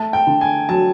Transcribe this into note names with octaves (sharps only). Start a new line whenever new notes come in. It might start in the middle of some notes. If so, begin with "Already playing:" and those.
Already playing: A3 A5
G5
D3
G#5
F#3 A5